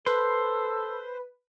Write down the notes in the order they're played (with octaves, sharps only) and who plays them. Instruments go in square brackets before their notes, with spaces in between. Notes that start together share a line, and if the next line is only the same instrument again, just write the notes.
[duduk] A4 [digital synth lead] B4 [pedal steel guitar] C5